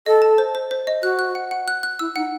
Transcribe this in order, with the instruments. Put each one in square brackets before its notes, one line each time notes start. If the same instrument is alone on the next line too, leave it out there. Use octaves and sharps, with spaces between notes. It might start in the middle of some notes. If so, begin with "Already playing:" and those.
[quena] A4 [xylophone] D#5
[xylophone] A5
C5
C5
C5
D#5
[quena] F#4 [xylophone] F#6
[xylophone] F#6
F#5
F#5
F#6
F#6
[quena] E4 [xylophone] E6
[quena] D#4 [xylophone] F#5